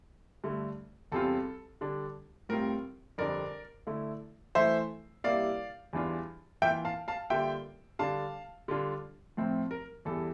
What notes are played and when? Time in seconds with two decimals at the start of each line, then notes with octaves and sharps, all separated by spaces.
0.44 G2 D3 A3
1.12 E2 C3 G3 C4 F4 A4
1.81 D3 G3 D4
2.49 A2 G3 C4 F4 A#4
3.18 F2 D3 G3 D4 A#4 D5
3.87 D3 A3 E4
4.55 E3 A3 E4 C5 E5
5.24 C3 G3 A#3 E4 D5 F5
5.93 E2 E3 G3 D4 F4
6.62 E3 A#3 F4 E5 G5
6.85 F5 A5
7.08 F5 A5
7.30 D3 G3 A#3 F4 E5 G5
7.99 D3 G3 D4 F5 A5
8.68 D3 G3 D4 F4
9.37 A2 F3 C4 E4
9.71 A#4
10.05 E2 E3 G3 A4